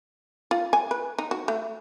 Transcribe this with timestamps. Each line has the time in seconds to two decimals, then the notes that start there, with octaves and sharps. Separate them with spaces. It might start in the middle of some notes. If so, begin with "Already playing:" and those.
0.51 F4
0.73 G#5
0.91 B4
1.18 D#4
1.31 F#4
1.48 A3